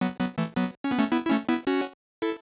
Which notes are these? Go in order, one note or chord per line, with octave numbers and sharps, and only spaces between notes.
F#3 B3
F#3 B3
E3 A3
F#3 B3
C#4
B3
A3 C#4
B3 E4
E4
A3 C#4
B3 E4
C#4 F#4
E4 A4